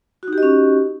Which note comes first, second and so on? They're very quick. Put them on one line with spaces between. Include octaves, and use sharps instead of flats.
F#4 D#4 G4 D#5 C#4